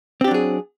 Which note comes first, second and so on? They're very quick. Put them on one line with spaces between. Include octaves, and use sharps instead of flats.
C4 G4 D4 F#3 G#4